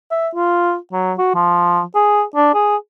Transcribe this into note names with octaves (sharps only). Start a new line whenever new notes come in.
E5
F4
F#3
F#4
F3
G#4
D4
G#4